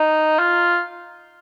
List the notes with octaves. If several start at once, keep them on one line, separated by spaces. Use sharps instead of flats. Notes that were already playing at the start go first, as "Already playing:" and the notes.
Already playing: D#4
F4